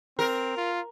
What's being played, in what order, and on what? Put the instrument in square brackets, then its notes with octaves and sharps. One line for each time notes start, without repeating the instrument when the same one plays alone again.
[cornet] C4 [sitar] A#4
[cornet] F4